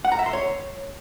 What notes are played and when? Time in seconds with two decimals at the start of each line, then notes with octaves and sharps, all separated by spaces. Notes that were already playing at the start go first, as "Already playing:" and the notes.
0.05 F#5
0.12 A#5
0.19 E5
0.26 C6
0.33 C#5